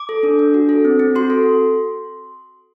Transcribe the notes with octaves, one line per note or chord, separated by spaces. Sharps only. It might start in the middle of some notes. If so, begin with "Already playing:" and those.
Already playing: D6
A4
D4
D4
F#4
A4
C4
C4
F#4 C6
A4